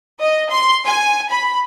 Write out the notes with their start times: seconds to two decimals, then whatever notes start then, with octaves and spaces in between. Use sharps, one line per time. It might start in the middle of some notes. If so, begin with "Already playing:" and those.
0.20 D#5
0.50 C6
0.86 G#5
1.31 B5